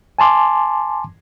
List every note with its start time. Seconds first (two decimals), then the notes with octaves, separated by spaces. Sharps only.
0.19 G#5 A5 C6 D6